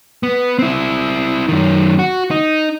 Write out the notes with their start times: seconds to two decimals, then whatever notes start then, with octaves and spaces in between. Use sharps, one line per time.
0.23 B3
0.59 C4 E4
1.49 F#2 D#3
1.99 F#4
2.31 D#4